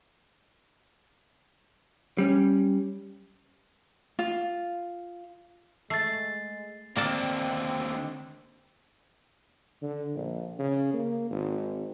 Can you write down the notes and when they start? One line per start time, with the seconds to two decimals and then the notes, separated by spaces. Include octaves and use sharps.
2.18 G3 C#4
4.19 F4
5.90 G#3 A3 A6 C7
6.96 D#2 D3 A#3 C4 D5 A5
9.82 D3
10.15 A#1
10.59 C#3
10.94 A#3
11.30 G#1